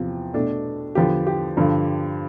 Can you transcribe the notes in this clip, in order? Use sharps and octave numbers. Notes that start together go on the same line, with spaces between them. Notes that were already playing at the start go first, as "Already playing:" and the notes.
Already playing: E2 C3 F3
B2 A3 D4
E2 D3 F3 B3 G4
G4
G2 D3 F3